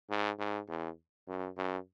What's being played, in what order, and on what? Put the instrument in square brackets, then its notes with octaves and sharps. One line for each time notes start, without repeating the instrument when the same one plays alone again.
[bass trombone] G#2
G#2
E2
F#2
F#2